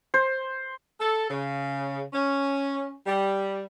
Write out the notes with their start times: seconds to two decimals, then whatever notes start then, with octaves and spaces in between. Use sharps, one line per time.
0.14 C5
1.00 A4
1.29 C#3
2.13 C#4
3.06 G3